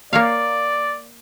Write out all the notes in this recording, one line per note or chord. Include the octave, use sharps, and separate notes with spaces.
A#3 C#5 D5 F5